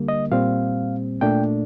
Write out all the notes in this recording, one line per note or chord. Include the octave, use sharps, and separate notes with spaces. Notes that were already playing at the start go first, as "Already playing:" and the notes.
Already playing: D3 G3 A#3
D#5
A#2 G3 C4 F5
A#2 A3 D4 G5